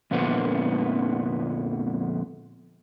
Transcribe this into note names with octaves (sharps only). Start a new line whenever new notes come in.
F2 A#2 D3 F3 B3